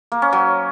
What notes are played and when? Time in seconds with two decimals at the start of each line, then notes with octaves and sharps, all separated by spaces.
0.12 A#3
0.22 C#4
0.33 F#3